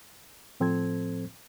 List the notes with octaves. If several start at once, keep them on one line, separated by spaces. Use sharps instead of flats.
A2 F3 C4 A4 C5 G#6